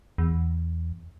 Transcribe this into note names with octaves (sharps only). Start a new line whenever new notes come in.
E2